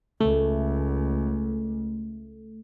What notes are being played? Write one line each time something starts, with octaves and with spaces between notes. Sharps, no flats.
C#2 A3